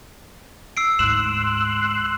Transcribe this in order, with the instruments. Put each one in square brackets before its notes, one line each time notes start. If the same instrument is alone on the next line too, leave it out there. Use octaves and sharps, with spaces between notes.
[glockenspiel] E6 C7 D7
[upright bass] D2 G#2 [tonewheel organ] C6 E6 F#6 [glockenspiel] E7